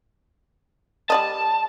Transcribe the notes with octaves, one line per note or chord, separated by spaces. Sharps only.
G3 D5 D#5 A5